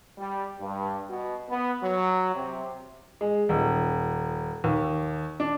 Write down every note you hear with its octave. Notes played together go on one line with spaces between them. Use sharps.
G3
G2
B2
B3
F#3
C3
G#3
D#1
D#2
D4